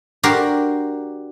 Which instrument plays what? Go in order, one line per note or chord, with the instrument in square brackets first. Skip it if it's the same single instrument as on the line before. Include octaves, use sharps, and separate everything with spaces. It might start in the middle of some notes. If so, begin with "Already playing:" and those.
[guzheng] D4 F#4 G4 A#4 C5